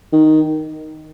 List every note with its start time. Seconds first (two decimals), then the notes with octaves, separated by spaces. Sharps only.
0.13 D#3